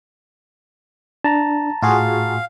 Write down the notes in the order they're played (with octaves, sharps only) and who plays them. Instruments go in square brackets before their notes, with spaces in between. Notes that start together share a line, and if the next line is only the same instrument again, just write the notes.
[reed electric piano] D4 [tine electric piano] A5 A#5
[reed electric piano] A2 [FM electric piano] F4 F#4 G#4 [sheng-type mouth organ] F5